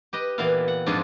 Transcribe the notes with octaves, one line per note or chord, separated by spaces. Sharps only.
G4 B4 D#5
A#2 E3 B3 E4 F5
F#5
F2 G#2 D4 F4 G#4